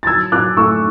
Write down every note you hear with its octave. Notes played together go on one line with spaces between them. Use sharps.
A6
F#3 E6 G#6
F#3 D6 F#6
A3 C#6 E6